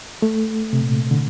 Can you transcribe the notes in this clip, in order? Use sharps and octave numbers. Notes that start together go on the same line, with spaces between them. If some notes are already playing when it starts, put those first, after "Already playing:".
A3
C3
A#2
D3